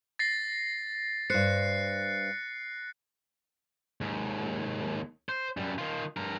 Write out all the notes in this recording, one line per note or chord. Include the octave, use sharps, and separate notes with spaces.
A6 A#6 C7
G2 C5 F#6 C7 C#7
D#2 G#2
C5
F#2 G3
D#3 F4
G2 A#4